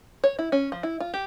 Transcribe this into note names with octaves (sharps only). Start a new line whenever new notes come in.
C#5
E4
C#4
F3
E4
F4
G4